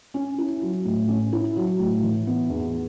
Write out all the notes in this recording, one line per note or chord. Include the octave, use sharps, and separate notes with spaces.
C#4
E4
F#3
A2
C#4
E4
F#3
A2
E3
B3
E2